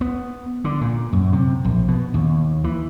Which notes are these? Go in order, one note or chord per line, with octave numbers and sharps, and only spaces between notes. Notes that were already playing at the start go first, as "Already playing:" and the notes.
B3
D3
A#2
F#2
C3
A#1
B2
D#2
E3